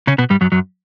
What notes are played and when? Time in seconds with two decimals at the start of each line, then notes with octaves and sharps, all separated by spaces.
0.07 C#3 C#4
0.18 B2 B3
0.30 G2 G3
0.41 F#2 F#3
0.52 F#2 F#3